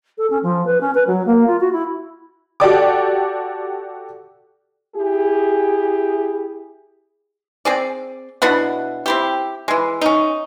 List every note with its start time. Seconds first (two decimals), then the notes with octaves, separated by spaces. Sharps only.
0.18 A4
0.30 C#4
0.43 F3
0.66 B4
0.81 C#4
0.95 B4
1.07 F#3
1.26 A#3
1.47 F4
1.61 F#4
1.72 E4
2.60 F#4 G4 A4 D5 G5 D6
4.96 E4 G4 G#4
7.65 C4 G#4 D5
8.42 B2 D4 E4 F#5
9.06 C4 E4 G4
9.68 E3 G#3
10.01 C#4 D#4